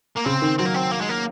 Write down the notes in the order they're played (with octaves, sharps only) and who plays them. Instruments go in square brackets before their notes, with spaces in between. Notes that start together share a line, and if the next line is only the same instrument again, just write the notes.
[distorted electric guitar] A#3
[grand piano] C#3 [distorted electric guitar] C4
[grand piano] D#3
[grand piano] F#3 [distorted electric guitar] C4
[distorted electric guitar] A#3
C4
A#3
G#3
A#3